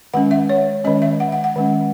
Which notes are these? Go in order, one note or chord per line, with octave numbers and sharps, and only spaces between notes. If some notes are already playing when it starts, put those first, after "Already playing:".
D#3 G#3 C#4 F#5
E5
C#5
D#3 G#3 C#4 D#5
E5
F#5
F#5
F#5
D#3 G#3 C#4